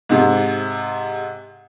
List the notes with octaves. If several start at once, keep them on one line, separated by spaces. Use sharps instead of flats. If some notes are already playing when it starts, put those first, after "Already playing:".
G#2 C3